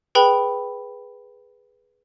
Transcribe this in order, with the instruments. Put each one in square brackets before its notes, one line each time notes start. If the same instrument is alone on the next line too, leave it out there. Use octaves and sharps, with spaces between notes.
[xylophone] G#4 B4 G5 B5